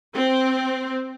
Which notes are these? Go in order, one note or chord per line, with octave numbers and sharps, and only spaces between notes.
C4